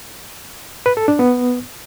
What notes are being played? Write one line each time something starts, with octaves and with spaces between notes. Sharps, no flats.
B4
A4
D4
B3